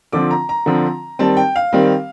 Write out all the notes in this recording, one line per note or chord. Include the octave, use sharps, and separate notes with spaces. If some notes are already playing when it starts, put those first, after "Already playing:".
D3 F3 C4 D6
A#5
A#5
D3 F3 C4
D#3 G3 C4 A5
G5
F5
D#3 G3 C4